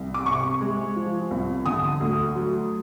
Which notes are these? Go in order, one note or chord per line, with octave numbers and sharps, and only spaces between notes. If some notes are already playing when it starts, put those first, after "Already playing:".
Already playing: C2
D6
C3 C#6
G#3
F3
C2
D3 D#6
D2
F#3